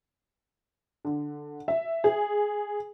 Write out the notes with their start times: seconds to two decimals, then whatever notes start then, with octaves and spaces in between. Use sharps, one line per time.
1.05 D3
1.68 E5
2.04 G#4